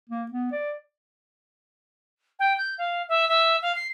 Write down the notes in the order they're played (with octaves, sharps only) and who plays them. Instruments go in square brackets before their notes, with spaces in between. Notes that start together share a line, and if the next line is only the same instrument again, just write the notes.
[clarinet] A#3
B3
D5
[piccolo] G5
G6
F5
E5
E5
F5
C7